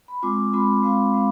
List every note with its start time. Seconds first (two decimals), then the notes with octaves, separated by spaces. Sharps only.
0.08 B5
0.23 G#3 C4 F4 D6
0.53 G#3 C4 F4 B5
0.83 G#3 C4 F4 F5
1.14 G#3 C4 F5